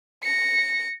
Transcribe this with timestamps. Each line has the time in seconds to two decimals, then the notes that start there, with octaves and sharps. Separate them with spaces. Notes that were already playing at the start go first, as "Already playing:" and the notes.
0.24 A#6 C#7